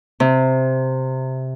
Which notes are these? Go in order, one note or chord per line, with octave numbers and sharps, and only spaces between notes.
C3